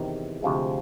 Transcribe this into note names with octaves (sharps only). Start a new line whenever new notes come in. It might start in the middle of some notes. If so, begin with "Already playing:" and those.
Already playing: E2 C3 D#3
D2 C3 F3 G#3